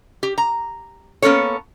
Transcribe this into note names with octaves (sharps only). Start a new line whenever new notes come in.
G4
A#5
A#3 B3 C#4 A4 C#5